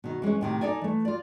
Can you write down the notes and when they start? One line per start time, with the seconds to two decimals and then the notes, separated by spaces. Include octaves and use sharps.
0.04 B2 D#3
0.22 E3 G#3 B3 C#4
0.41 A2 C3 D#3
0.61 D#4 A4 D5 G#5
0.82 E3 A3
1.05 F4 D5